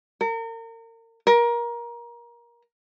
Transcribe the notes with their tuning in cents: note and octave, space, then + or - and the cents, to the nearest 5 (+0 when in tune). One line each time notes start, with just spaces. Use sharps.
A#4 -35
A#4 +25